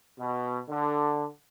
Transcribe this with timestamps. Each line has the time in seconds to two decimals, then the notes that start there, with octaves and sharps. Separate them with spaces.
0.18 B2
0.69 D3